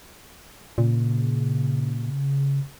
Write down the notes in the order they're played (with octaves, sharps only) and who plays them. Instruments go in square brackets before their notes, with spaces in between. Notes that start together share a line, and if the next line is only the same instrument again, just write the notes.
[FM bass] A#2 [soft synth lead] C#3